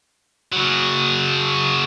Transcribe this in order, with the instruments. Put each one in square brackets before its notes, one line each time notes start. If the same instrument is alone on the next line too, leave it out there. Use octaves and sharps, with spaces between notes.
[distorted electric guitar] C#3 F#3